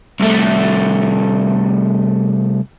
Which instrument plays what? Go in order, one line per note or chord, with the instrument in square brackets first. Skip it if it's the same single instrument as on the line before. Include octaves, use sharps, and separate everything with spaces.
[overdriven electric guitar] C2 A3